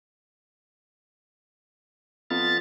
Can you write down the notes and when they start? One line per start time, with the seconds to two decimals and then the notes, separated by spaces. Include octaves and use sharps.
2.30 F2 B3 F4 A6